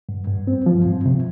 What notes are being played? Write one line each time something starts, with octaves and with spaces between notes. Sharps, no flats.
G2
G2
C4
F3
G2
C3